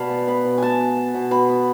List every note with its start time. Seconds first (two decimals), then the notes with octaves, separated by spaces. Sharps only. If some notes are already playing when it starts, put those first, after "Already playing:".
Already playing: B2 D5 F5 A5 B5
0.10 B3
0.27 B3 B5
0.45 B2
0.58 B2 G#5 A5
0.79 B3
0.97 B3
1.15 B2
1.31 B2 B5
1.49 B3